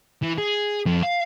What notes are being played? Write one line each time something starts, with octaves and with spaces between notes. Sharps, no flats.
E3
G#4
F2
F5